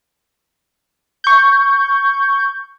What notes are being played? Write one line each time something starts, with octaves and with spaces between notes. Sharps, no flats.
C#6 G6